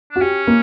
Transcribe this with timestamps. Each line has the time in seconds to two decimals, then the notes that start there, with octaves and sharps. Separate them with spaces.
0.11 D4 F#4
0.21 C#4 G4
0.47 A#3